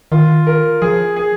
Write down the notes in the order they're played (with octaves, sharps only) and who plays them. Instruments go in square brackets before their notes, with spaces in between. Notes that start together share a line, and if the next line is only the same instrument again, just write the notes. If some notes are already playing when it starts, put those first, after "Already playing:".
[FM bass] D#3 [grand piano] F4
[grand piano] A#4
[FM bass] F3 [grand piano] G#4
[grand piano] G#4